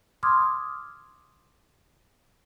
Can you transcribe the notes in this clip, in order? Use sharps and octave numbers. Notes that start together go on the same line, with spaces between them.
C6 D6 D#6 F6 G#6